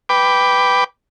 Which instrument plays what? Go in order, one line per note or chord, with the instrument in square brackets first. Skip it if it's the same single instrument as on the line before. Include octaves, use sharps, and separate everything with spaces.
[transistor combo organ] B4 G5 D6